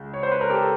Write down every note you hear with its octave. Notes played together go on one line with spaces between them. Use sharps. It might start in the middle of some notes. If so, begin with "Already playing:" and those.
Already playing: C#2
C#5
C5
B4
A#4
G4 A4